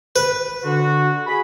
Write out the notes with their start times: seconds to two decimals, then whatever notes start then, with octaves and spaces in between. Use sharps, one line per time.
0.16 B4
0.64 D3 F#4
1.26 G#4 B5